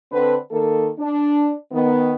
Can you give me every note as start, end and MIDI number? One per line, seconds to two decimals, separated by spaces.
0.11 0.36 50
0.11 0.36 60
0.11 0.36 71
0.50 0.89 51
0.50 0.89 58
0.50 0.89 69
0.99 1.52 62
1.72 2.15 51
1.72 2.15 59